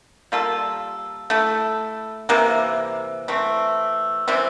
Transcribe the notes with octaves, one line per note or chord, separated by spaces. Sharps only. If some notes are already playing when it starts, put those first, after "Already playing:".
G3 A#3 F4 A4
A3 E4 A4
C3 E3 A#3
E3 A3 C4
C3 E3 G3 C4